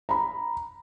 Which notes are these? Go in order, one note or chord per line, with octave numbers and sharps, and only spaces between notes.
A#5 B5